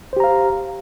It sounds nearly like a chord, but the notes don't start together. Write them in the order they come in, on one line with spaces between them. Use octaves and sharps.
C5 G4 A#5 F5